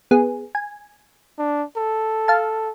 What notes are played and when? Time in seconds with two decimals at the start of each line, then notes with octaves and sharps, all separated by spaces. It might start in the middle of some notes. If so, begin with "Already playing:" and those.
0.11 B3 G#4
0.55 G#5
1.38 D4
1.77 A4
2.28 F5 A5